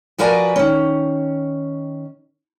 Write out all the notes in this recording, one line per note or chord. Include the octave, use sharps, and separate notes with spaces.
F3 F#4 A#4 B4 D5 G#5
D#3 C#4